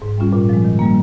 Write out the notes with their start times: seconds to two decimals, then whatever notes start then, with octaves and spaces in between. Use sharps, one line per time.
0.02 G#2
0.18 G3 C#4 F4
0.33 A#2
0.49 F3 G#3
0.64 D#3
0.79 G3 A#3